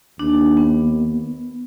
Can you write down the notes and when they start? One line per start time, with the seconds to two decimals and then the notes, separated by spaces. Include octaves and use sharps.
0.19 D#2 D4
0.57 B3